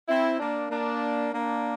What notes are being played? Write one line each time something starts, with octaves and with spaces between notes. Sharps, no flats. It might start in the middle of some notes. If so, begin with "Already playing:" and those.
C4 E4
A#3 D4
A#3 D4
A#3 D4